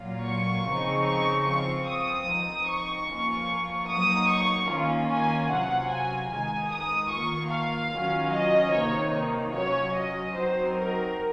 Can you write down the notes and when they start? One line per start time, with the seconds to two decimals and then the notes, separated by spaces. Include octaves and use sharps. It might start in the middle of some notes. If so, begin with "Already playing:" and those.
Already playing: A#2 F#3 A#3 F4
0.28 C#6
0.68 C#3 F3 C4 D#4
1.08 C#6
1.49 F3 C4 F4 C#6
1.89 D#6
2.29 F3 C4 D#4
2.69 C#6
3.10 F3 A#3 C#4 F4
3.90 F#3 A#3 D#4 D#6
4.30 C#6
4.70 D#3 A#3 C#4 F4
5.11 G#5
5.50 C3 F#3 C#4 F4 F#5
5.91 G#5
6.32 D#3 G#3 D#4 G#5
6.72 D#6
7.12 D#3 A#3 F4 C#6
7.52 F5
7.92 D#3 F#3 C#4 F4
8.33 D#5
8.73 C3 D#3 A#3 D#4 C#5
9.53 F#3 C#4 F4 C#5
9.93 D#5
10.34 F#3 C4 D#4 C5
10.75 A#4